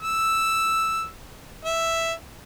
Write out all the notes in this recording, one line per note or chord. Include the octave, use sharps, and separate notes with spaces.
E6
E5